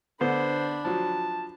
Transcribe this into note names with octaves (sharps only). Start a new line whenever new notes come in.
D3 B3 D4 C5 B5
F3 F#3 A5